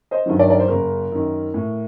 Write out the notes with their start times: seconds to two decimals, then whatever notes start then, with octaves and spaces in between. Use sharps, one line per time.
0.11 C5 D#5
0.26 G2 D#3 F#3
0.39 A#4 D5
0.50 D5
0.60 C5
0.68 F#1 A#4
1.12 F#2 D#3
1.54 A2